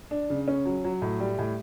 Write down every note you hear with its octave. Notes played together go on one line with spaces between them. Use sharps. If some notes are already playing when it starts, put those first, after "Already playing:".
D4
C#3
C#4
F#3
F#3
A2
G3
A2